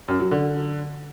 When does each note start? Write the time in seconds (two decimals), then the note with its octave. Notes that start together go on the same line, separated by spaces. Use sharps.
0.08 F#2
0.20 F#3
0.31 D3